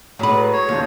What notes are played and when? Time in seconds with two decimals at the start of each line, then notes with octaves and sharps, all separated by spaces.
0.19 A2 F#3 G#3 B4
0.53 C#5
0.69 D#2 C#3 F3 F4